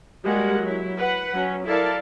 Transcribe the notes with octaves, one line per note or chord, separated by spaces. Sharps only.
G3 G#3 A#3 F#4 G4 F#5
F#3 E4
B4 F#5
F#3 C#4
E4 A4 A#4 D5 F5 A5